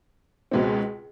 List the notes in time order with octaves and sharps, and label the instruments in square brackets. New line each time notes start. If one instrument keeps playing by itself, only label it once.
[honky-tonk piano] C#2 B2 G#3 C4